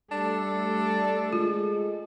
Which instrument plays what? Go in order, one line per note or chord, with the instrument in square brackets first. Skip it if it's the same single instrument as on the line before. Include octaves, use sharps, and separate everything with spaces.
[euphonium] G3 [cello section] A3 A4 [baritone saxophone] D4
[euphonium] G#3 [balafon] F4